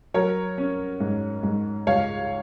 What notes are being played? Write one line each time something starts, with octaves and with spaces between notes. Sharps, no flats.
F#3 A#4 C#5
C#4
G#2
G#2
C#2 C#5 F5